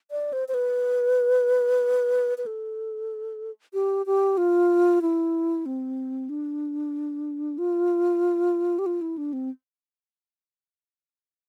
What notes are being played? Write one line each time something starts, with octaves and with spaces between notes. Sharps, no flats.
D5
C5
C5
B4
B4
A4
G4
G4
F4
E4
C4
D4
F4
G4
F4
E4
D4
C4